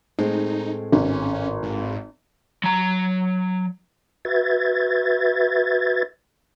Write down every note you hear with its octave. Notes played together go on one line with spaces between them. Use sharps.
A2 G#3 C4 D#4
G#1 C#4
G#2
F#3 A#5
F#4 B4 E5 G#6 A6